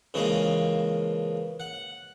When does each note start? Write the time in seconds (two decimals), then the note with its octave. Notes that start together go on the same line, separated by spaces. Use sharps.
0.14 C#3 E3 F3 G#3 A#3
1.60 F#5